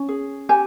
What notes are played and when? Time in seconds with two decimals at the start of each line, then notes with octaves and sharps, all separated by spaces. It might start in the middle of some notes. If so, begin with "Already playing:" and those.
Already playing: C#4
0.09 G#4
0.49 G4 G#5